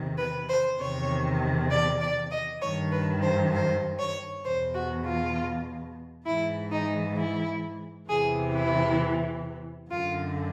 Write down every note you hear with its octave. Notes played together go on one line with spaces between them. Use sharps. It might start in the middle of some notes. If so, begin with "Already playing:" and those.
Already playing: E2 C3 D#3
B4
C5
E2 C3 D#3 C#5
D5
D5
D#5
G2 D#3 C#5
B4
C5
C5
C#5
E2 B2 C5
F#4
F4
G#2 E3 E4
D#4
E4
E2 C3 E3 G#4
E4
F#2 D3 F4